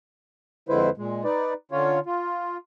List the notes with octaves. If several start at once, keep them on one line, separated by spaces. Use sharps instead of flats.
F2 D3 G#3 E4 B4 C5
A#2 G#3
D#4 B4 D5
D3 C#4 F4 C#5
F4